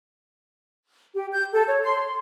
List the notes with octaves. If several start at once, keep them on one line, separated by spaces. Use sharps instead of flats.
G4
G6
A4
C#5
C6
C6